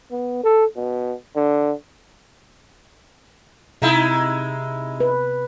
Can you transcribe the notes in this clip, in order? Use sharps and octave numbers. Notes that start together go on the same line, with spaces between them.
B3
A4
B2
D3
C3 G#3 D#4 E4
B4